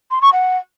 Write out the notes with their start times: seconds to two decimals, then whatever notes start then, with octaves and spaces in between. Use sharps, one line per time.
0.11 C6
0.22 C#6
0.33 F#5